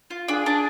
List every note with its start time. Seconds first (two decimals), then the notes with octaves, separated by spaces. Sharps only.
0.10 F4
0.28 D4 G#4
0.46 D4